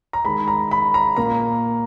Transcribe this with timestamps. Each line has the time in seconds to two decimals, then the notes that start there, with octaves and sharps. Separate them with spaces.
0.13 A#5
0.25 D#3 G#3 B5
0.48 A#5
0.71 B5
0.94 A#5
1.17 A#2 A#3 A#5